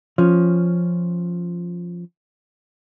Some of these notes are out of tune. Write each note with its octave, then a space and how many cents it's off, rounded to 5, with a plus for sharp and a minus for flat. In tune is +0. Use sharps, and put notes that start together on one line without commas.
F3 +0 C#4 +0